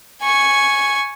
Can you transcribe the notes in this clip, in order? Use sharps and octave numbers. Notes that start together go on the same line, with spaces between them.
G#5 C#6